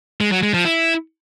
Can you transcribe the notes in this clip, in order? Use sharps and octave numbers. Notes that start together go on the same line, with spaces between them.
G#3
F#3
G#3
F3
E4